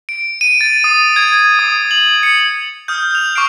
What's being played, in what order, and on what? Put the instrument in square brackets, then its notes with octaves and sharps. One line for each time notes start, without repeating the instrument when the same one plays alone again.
[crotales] D7
D#7
A6
D#6
G#6
D#6
F#7
C#7
D#6 F6 G6
G6 F7
C#6 D6 F6 C7 D7